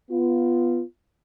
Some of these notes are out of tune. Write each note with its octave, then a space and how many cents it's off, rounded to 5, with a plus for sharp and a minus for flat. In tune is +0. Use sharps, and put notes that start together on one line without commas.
B3 +0 F4 -15